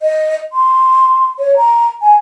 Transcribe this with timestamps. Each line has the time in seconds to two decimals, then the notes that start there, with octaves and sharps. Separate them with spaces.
0.01 D#5
0.53 C6
1.39 C#5
1.56 A#5
2.02 G#5